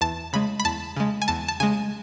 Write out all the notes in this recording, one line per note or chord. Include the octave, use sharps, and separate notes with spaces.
E2 A5
C#3 G#3 B5
B5
E2 A5
C#3 G#3
G#5
E2 A5
A5
C#3 G#3 G#5